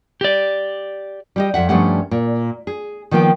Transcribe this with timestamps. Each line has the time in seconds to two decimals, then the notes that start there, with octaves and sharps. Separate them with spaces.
0.21 G4 D5
1.36 G3 G4 D#5
1.54 F2 E5 F#5
1.69 G2 F3 A3 C#4 G4 F#5
2.11 A#2
2.67 G#4
3.11 D#3 F3 A#3 B3 G5